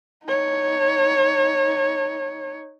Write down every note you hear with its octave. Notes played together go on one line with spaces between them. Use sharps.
D#4 C#5